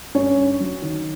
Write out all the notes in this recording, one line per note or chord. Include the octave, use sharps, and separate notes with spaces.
G2 C#4 C#5
G2
F#3
D#3